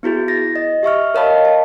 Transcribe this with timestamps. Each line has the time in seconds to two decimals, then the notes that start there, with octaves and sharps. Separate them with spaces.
0.03 B3 E4 F#4 G#4
0.28 A6 A#6
0.56 D#5
0.83 G4 E5 C#6 F6
1.14 A#4 C#5 D#5 F5 A5 B5
1.45 A5